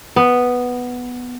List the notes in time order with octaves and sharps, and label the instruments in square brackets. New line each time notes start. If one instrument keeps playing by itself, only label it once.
[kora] B3